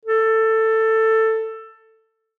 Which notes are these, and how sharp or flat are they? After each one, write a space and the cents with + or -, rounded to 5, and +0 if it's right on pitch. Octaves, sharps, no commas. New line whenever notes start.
A4 +15